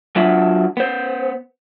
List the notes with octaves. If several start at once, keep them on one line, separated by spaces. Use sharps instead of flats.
F#3 D4 F4 E5 F#5
B3 C5